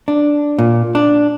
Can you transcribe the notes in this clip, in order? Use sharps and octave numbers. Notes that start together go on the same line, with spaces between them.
D4
A#2
D4